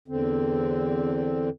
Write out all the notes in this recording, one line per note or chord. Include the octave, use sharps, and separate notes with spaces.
E2 D3 C4